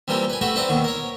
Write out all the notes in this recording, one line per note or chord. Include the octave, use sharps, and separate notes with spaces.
C3 E3 G3 A#3 F4 G4
B4 G#5
A3 F#4 G4 B4 E5 F#5
C4 E4 B4 D5 F#5 A#5
D#2 B2 D#3 C#6
A#4 C#5